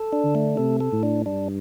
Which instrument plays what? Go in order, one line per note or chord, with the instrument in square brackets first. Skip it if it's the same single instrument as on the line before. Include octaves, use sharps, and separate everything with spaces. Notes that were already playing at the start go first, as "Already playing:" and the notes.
Already playing: [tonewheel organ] A4
D4
[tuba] D3
[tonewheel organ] A3
[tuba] C3 [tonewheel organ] A4
[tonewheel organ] A4
[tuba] A2
[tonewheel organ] D4
[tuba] G2 [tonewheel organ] D4